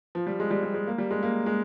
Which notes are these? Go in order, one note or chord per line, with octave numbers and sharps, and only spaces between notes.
F3
G3
G#3
G3
G3
G#3
A#3
G3
G#3
A#3
G#3